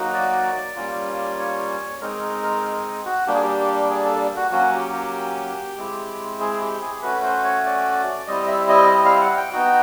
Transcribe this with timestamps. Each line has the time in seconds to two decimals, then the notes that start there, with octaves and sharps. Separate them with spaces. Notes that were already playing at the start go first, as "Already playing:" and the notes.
Already playing: F#3 A#3 D#4 F#4
0.14 D5
0.76 G3 A#3 C#4 F4
1.39 C#5
2.01 G#3 C4 D#4 A#4
2.43 A#4
3.05 F#4
3.27 G3 A#3 D4 G4
3.34 G#4
3.43 G4
3.89 G#4
4.05 A4
4.36 F#4
4.51 F#3 A#3 C#4 F#4
4.73 G4
4.93 G4
5.77 G#3 C4 E4
6.40 G#4
6.61 G4
6.81 G#4
7.02 A3 C#4 F#4 B4
7.23 C5
7.44 C#5
7.65 D5
8.27 G3 C4 E4 D#5
8.48 E5
8.69 D#5
8.90 D#5
9.05 F5
9.21 F#5
9.37 G5
9.52 B3 D#4 F#4